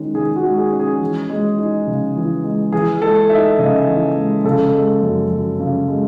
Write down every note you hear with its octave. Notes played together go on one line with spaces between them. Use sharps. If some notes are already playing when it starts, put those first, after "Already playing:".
Already playing: D#3 G#3 C#4
D#3 G#4
F#4
G#3
G#4
C#4
G#4
E3
G#3
D#4
C#3
E3
G#3
E3 G#4
G#3 A4
D#4 E5
C#3 D#5
E3
G#3
C#3 A4
G#3
F#2
F#2
C#3
G#3